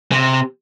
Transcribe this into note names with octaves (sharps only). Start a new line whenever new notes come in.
C3